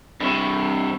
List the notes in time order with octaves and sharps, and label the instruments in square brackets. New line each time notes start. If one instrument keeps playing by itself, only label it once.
[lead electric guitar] G2 C3 [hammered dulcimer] E4 C#6